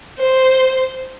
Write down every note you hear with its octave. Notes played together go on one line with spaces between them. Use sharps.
C5